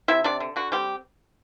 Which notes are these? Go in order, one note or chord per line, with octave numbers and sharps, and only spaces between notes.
C3 E4 E5
C3 D4 D5
D3
D3 F#4
G3 C4 G4